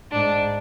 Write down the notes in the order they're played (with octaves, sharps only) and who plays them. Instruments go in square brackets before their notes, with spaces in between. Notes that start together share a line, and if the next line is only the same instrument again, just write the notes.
[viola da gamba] G#2 [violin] D4